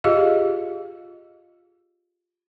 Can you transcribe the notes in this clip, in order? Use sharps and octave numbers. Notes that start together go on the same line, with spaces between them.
F4 G4 G#4 D#5 F5